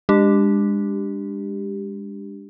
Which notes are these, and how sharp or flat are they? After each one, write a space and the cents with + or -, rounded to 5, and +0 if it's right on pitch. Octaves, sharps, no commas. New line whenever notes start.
G#3 -30 D4 +0 G4 +0